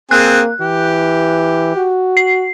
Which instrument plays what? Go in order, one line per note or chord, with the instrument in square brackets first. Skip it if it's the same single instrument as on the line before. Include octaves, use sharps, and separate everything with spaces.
[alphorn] A#3 [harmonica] C4 G#4 G#5 [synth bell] F#6
[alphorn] E3 [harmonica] G4
[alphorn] F#4
[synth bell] C7